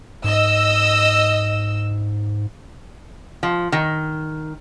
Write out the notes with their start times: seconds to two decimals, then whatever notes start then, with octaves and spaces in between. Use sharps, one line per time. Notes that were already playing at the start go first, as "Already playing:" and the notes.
0.24 G#2 D#5 E6
3.43 F3
3.72 D#3